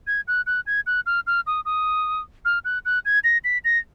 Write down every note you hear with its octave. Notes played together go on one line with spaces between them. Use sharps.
G#6
F#6
F#6
G#6
F#6
F6
F6
D#6
D#6
F6
F#6
F#6
G#6
A#6
B6
A#6